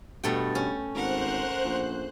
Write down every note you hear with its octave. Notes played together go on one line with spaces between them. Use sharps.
G2 B2 A3 G5
C#4
G#1 A#4 C5 F#5 F#6
A#1